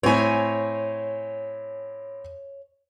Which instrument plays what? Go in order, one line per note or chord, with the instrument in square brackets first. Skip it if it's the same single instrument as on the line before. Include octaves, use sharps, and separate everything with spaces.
[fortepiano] A2 C4 [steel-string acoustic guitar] C#5 G#5